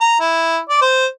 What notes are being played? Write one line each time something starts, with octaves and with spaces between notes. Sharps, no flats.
A#5
E4
D5
C5